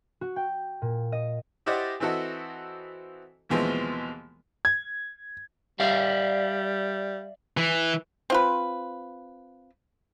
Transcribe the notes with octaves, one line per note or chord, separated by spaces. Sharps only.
F#4
G5
A#2
D#5
E4 G4 C5 D5 D#5 F#5
E3 C4 E4 F#4 A4 D#5
D#2 B2 E3 F3 G#3 C4
G#6
G3 D5 E5 F5
E3
C4 F4 B4